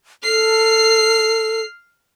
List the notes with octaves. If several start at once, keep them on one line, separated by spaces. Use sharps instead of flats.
A4 F6 C7